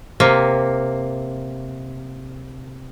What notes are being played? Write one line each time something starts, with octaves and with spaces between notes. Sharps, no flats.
C3 A#3